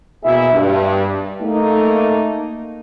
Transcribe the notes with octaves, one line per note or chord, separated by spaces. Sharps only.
B2 A#3 E4 G#4 E5
G2
A3 A#3 D#4